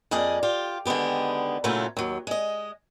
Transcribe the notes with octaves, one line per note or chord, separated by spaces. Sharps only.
F2 A#3 G#4 D5 D#5
F4 G4
D3 D#3 G#3 B3 G4
A#2 C#3 F#3 A3 E4 F4
D#2 F#3
G#3 D#5